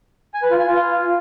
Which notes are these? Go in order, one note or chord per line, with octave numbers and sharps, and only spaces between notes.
G#5
B4
F4
G#5
F4